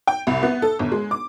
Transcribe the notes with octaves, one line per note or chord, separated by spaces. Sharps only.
G5
C2
B3
A4
G1
G#3
D6